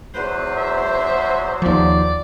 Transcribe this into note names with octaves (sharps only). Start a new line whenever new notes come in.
E2 F#3 B4 C5
E5
D#2 F3 D5